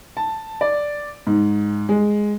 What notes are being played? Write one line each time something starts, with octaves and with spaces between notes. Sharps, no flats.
A5
D5
G#2
G#3